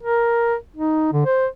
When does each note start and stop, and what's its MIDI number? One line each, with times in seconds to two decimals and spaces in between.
0.03 0.55 70
0.76 1.12 63
1.13 1.24 50
1.26 1.47 72